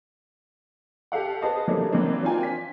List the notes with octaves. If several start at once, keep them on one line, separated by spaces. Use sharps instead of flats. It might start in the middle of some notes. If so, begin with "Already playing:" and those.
G4 A4 F5 F#5
G#4 B4 C5 D#5 A5
E3 F#3 G3 A3 A#3 D4
E3 F#3 A#3 C4 D4 D#4
C4 D4 F4 A#4 G5 G#5
B6